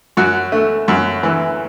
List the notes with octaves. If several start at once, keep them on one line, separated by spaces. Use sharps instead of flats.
F#2 F#4
A3
F#2
E3